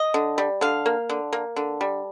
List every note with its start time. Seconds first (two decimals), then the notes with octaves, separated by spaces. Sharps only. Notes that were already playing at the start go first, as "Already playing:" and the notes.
Already playing: D#5
0.14 D3
0.38 G3
0.61 D3 F5
0.86 A#3
1.10 D3
1.33 A#3
1.56 D3
1.81 G3